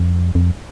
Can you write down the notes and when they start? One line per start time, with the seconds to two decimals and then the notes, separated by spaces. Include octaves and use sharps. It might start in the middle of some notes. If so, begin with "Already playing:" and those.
Already playing: F2
0.35 F2